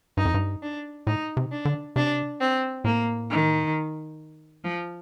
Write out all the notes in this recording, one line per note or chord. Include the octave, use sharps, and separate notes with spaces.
G2 D#4
F2
G2
D4
A2 D#4
C3
D4
D3
C3 D4
C4
A2 A#3
D#3
F3